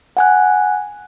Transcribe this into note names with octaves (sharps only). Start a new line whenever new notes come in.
F#5 G#5 F#6